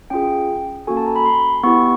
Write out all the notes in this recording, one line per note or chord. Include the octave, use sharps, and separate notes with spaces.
C#4 F4 G#4 G5
A#3 C#4 F#4 A4 G#5
A5
A#5
B5
C6
B3 E4 G4 C#6